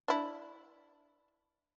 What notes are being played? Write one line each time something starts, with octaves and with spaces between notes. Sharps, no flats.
D4 E4